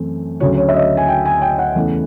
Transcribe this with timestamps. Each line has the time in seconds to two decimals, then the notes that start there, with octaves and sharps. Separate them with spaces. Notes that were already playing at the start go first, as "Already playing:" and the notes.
Already playing: F#2 E3 A3 C4
0.40 D2 C#3 F#3 C#5
0.57 C#5
0.68 E5
0.74 D#5
0.97 G#5
1.08 G5
1.25 G#5
1.42 G5
1.58 F#5
1.75 E2 C#3 E3 A3